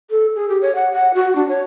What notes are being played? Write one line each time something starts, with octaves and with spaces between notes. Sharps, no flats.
A4
G#4
G4
C#5
F#5
F#5
F#4
D4
C#5